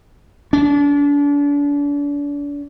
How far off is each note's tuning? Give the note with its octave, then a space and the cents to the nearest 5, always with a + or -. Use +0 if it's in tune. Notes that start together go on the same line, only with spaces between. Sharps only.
D4 -35